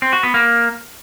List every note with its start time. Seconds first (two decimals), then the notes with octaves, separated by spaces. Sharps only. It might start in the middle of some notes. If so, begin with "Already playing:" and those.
0.02 C4
0.13 F#4
0.23 B3
0.34 A#3